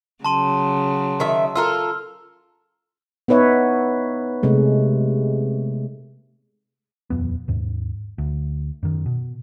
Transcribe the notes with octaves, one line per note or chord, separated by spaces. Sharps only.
C#3 F#3 A5 C6 D#7
D#3 E5
F4 A4 A#4 E6 F6
B3 D#4 B4 C#5 E5
C3 G#3 A3
D#1 F2 B3
D#2 G#2
D2
F#2 D#3
B2